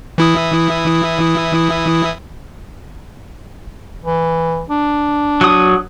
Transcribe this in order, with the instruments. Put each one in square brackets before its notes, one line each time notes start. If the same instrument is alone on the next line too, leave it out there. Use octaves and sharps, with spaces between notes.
[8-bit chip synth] E3 E4 D#6
[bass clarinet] E3
D4
[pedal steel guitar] F#3 D#6